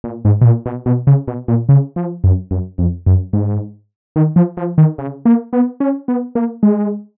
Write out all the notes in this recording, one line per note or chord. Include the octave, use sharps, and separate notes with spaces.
A#2
G#2
B2
A#2
B2
B2
C#3
B2
A#2
C#3
F3
F#2
F#2
F2
F#2
G#2
D#3
F3
F3
D#3
C#3
A#3
B3
C#4
B3
A#3
G#3